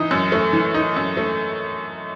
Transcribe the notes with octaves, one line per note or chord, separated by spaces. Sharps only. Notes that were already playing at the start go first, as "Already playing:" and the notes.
Already playing: E3 D#4
F#2
A3
E3
D#4
F#2
A3